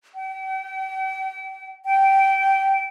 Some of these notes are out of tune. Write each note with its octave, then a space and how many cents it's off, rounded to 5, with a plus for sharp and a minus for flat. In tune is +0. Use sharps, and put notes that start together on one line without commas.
G5 -40
G5 -15